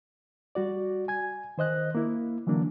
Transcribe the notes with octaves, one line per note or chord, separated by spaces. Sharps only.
G3 F#4 D5
G#5 G#6
D#3 C5 D#5 F#6
A#3 E4
D3 E3 F#3 A#3 D4